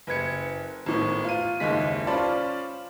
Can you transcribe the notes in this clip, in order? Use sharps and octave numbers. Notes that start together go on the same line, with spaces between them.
F#1 B4 G#6 C#7
G#1 A2 B3
F4 D#7
F#1 D#2 G#3 B6
C#4 F4 C5 D5 A5 B5